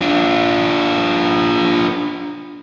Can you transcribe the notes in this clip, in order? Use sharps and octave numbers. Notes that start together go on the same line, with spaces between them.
D4 F4